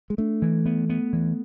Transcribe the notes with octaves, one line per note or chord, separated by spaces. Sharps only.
G#3
A3 D4
E3
B3
B3
E3